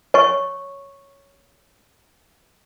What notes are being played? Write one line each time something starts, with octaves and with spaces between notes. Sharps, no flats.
C#5 C#6